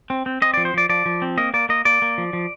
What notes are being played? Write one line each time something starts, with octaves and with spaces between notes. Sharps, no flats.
C4
C4
C4 D#5
D5
F3
C5
F3 D5
F3 D5
F3
C4
A#3 D#5
A#3 D5
A#3 D#5
A#3 D5
A#3
F3
F3